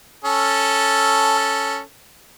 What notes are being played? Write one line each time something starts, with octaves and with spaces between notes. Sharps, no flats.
C#4 A4